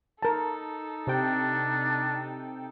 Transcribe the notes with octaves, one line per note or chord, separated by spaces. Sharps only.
D#4 A4 A#4 A5
C3 D4 G5